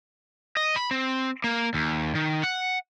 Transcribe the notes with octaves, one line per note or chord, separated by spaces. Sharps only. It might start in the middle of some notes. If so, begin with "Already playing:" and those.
D#5
B5
C4
A#3
D#2
D#3
F#5